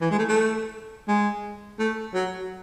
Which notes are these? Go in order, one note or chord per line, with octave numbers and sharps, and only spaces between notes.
E3
G#3
A3
A3
G#3
A3
F#3